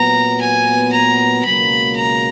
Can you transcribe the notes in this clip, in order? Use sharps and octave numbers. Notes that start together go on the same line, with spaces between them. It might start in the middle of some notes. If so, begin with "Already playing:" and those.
Already playing: A#2 F#3 B3 A#5
G#5
A#5
C#2 B2 F#3 A#3 B5
A#5